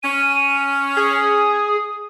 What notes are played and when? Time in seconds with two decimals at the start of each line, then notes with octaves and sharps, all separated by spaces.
0.03 C#4 D#7
0.97 G#4 D#6